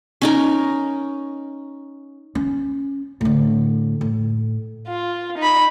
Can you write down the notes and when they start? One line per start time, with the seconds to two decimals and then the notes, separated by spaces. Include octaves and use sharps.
0.22 C#4 D#4 A#4
2.35 C#4
3.21 A2 D3
4.01 A2
4.87 F4
5.38 D#4 B5